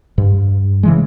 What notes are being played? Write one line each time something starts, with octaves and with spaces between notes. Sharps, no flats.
G2
C#3 E3 G#3